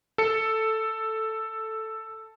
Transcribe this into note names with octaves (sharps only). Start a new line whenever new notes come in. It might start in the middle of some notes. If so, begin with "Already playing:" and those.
A4 C#7